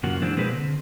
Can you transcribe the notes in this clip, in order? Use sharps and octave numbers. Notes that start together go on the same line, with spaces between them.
F#2 C#3 F3 A#3 F#4
E3 F3 G#3 C4 D4
B2 G#3 A#3 C4 G#4 B4
D3 C4